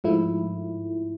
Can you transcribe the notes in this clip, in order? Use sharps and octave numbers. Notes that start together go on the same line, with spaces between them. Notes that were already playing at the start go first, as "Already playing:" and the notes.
G#2 F3 A3 E4